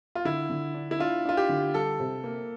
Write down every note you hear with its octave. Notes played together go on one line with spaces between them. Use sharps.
F4
D3 E4
D3
D4
E4
D4 F4
D4 F4
G4
D3
G3 A4
C3
A#3